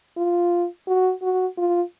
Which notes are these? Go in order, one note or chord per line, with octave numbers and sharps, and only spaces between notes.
F4
F#4
F#4
F4